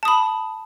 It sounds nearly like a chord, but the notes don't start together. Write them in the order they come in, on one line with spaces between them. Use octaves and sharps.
A5 D#6 B5